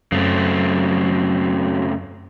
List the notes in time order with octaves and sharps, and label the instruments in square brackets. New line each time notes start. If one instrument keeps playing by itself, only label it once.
[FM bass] F#2 [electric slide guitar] C#3 A3 C4 [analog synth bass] F#3